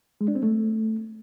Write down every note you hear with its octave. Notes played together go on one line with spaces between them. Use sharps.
G#3
D4
C4
A3